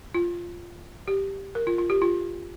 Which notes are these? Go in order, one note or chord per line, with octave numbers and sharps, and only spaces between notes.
F4
G4
A#4
F4
F4
G4
F4